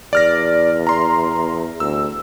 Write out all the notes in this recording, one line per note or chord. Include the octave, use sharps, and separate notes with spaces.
E2 D5 F6 A#6
A#5 C6
D2 E6